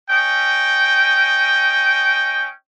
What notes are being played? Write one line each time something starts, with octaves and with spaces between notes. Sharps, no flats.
C#4 D#5 G5